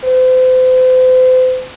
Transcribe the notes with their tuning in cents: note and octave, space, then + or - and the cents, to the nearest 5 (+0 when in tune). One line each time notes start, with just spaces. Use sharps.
C5 -40